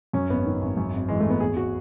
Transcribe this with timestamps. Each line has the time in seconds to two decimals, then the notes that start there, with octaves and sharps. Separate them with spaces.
0.13 F#2 C#4
0.30 G#1 B3
0.46 D#3
0.62 G#1
0.77 F#2
0.94 G#1
1.08 E3 G#3
1.20 A3
1.25 G#1 B3
1.40 E2 G#4
1.57 F#4